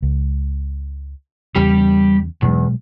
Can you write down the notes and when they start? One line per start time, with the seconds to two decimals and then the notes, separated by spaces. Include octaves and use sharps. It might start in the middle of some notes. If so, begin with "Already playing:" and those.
0.02 C#2
1.56 E2 C#3 G3 G4
2.42 E2 B2 F#3 G#3